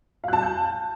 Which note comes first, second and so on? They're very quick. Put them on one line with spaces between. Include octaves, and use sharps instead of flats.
F5 F#6 A5 G#5 G6